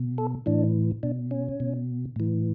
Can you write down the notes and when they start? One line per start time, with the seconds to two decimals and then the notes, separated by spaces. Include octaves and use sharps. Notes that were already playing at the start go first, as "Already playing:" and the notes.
Already playing: B2
0.18 A4
0.46 A2 E3 D4
1.03 B2 D4
1.31 C#4
1.60 B2
2.16 A2 E3